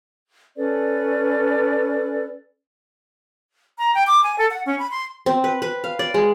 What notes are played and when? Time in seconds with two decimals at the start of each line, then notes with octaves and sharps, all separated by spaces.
0.57 C#4 A4 B4 D5
3.78 A#5
3.94 G5
4.07 D6
4.23 G#5
4.39 A4
4.51 F#5
4.66 C#4
4.79 B5
4.91 C6
5.26 C4
5.44 B4
5.62 B4
5.84 F5
5.99 D5
6.14 G#3